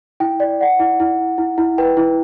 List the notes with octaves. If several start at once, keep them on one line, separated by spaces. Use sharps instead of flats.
E4 G5
D5
D5 F#5
E4
E4
E4
E4
E4
B4 G5
E4